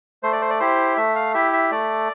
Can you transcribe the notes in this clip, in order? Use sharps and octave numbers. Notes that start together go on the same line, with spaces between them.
A3 C5
D5
C5
D5
E4 G4 C5
A3 E5
F5
E4 G4 E5
E5
A3 D5